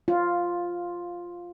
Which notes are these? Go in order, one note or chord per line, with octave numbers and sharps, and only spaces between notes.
F4